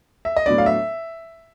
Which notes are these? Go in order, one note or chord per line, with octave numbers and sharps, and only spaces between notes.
E5
D#5
A2 F#3 B3 D4 D5
F5
E5